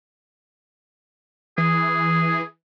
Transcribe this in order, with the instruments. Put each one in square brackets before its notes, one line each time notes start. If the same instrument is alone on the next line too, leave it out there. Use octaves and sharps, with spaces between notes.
[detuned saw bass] E3 [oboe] G#4